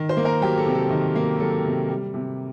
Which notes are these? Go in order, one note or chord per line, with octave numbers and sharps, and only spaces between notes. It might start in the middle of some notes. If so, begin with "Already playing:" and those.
Already playing: D#3
C5
A#3
A#4
F#3 G4
A4
C3
A4
D#3
A#3
F#3 A4
C3
G3
C3